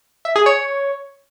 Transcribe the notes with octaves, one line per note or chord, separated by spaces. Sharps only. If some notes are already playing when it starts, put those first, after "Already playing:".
E5
G#4
C#5